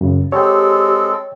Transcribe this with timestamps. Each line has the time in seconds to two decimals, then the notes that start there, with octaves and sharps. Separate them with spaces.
0.01 F#2 C#3
0.32 G#3 C4 G4 A4 C#5 G5